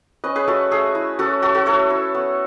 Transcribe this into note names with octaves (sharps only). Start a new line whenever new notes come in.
C#4 B4 D#5
G#4 B4
A3 F#4 A4
A3 G#4
E4
C#4 F#4 A4
A3 F#4 A4
F#4 A4
A3 A4 C#5
E4
B3